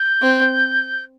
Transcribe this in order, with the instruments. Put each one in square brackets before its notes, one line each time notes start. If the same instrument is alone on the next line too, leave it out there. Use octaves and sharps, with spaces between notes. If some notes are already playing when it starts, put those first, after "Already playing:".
Already playing: [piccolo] G6
[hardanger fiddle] C4